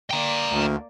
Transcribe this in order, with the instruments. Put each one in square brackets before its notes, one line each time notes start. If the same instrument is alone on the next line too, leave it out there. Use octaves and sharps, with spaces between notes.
[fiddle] A#3 D5 [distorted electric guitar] G5 A#5
[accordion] D2